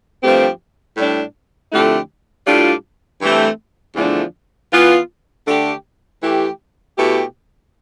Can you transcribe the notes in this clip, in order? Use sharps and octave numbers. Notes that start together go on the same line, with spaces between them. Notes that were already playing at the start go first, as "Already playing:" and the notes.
G2 F3 A3 C4 G4
A2 G3 D4
F2 D3 A3 E4 G4
A2 G3 D4 F4
G2 E3 A3 C4 G4
E2 D3 F3 A3 D4
E3 B3 F4
D3 A3 D4 G4
E3 A3 E4 G4
B2 A3 E4 G4